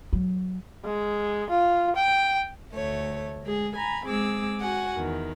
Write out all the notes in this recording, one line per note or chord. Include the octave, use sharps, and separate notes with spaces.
F#3
G#3
F4
G5
D2 A3 C#5
G#3 G#4
G#5 A#5 B5
G#3 C4 G#4 D6 E6
F#4 F#5 G#5
E2 D#3